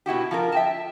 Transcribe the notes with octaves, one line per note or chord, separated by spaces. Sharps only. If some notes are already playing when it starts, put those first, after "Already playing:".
B2 E4 F#4 G4
F3 F4 A#4
E5 G5 A5